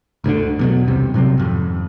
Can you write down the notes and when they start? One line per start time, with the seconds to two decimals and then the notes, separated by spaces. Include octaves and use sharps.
0.24 G1 D2 A#2 D3
0.59 E2 B2 F#3
0.87 F#1 C2 C3 G3
1.14 A2 C3 F#3 C4
1.38 G#1 F2